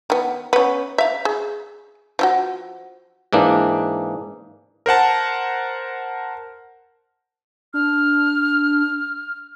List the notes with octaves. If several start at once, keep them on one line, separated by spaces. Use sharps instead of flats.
D#3 B3
B3 C#4
E5 F5
G#4
F3 E4 F#4
G#2 E3 A#3 D4
A#4 C5 F#5 A5
D4 F6